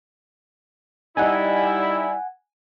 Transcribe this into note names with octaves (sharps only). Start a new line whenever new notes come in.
G3 D#4 E4 D5 D#5 F#5 G#5